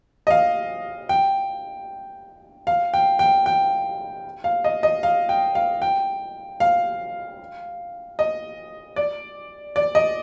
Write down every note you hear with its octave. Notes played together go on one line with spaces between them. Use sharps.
D#5
F5
G5
F5
G5
G5
G5
F5
D#5
D#5
F5
G5
F5
G5
F5
D#5
D5
D5
D#5